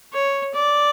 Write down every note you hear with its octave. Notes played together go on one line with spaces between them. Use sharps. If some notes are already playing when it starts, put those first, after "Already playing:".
C#5
D5